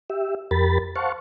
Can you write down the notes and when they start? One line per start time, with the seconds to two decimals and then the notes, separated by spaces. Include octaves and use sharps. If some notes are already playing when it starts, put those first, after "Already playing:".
0.10 G4 E5
0.51 F2 G4 A#4 B5 A6
0.96 C5 F5 F#5 A5 C#6